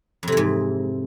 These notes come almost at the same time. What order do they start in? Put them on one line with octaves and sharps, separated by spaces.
F2 C3 E3 G#2